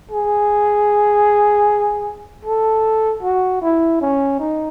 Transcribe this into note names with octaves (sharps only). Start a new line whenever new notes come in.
G#4
A4
F#4
E4
C#4
D#4